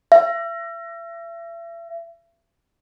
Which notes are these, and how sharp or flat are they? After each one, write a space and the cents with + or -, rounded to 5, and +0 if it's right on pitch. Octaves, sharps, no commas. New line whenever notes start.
E5 +35